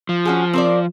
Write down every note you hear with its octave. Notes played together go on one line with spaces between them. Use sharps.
F3
C#4 F#4 G#4
C4 A#4 D5